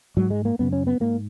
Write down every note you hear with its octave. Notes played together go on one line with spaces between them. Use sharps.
G#2 F#3
G#3
A#3
F#2 C#3 B3
C#4
B3
G#2 A#3